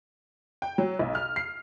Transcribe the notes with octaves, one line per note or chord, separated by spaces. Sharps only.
G5
F#3
B1
F6
C7